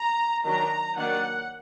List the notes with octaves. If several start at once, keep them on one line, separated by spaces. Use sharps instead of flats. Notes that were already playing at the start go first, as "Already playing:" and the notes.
Already playing: A#5
D#3 F#3 D4 A#5
D#3 F#3 A#3 D4 F#5